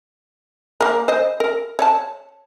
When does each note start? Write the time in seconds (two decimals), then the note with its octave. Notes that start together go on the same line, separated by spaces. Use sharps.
0.81 A#3 A#4
1.08 C5 D#5
1.40 A#4
1.79 C#5 D5 A5